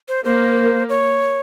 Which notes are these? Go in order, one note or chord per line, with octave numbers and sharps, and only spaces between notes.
C5
A#3 C5
C#5